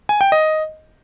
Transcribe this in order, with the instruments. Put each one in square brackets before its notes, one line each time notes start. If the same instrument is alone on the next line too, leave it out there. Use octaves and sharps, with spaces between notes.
[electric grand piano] G#5
G5
D#5